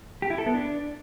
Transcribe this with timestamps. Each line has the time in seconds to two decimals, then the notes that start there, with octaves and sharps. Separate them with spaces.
0.22 G4
0.30 E4
0.38 A4
0.46 B3
0.54 D4